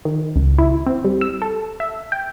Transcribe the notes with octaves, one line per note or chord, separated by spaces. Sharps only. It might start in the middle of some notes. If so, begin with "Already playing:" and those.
D#3
C#2
E4
C4
G3
E6
A4
E5
G5